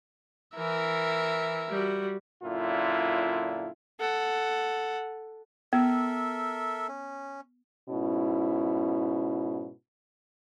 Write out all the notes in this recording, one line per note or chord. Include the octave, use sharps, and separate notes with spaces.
E3 A#4 E5
G3 F#4
F#2 A#2 D3 E4 F4
A4 F#5
B3 A4 A#4 E5
C#4
G#2 B2 C#4 E4